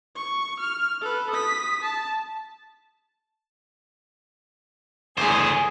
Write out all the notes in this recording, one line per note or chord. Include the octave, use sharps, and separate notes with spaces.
C#6
F6
A4 B4
D#6 B6
A5
G1 E2 A3 G#4 C5